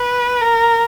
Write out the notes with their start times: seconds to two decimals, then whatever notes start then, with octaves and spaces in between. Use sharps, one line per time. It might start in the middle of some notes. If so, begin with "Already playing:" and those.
Already playing: B4
0.41 A#4